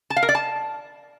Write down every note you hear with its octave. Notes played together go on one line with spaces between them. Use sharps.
A5
F5
A#4
D5
A5